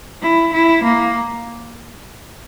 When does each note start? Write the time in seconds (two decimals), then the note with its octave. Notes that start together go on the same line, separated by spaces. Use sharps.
0.22 E4
0.53 E4
0.83 A#3